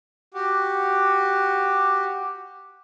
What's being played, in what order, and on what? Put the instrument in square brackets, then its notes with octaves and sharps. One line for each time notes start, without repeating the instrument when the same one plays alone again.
[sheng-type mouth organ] F#4 G4